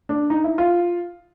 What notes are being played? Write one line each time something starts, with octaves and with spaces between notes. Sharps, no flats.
D4
D#4
E4
F4